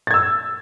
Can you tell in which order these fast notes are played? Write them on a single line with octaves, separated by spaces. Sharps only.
A6 G#6 E6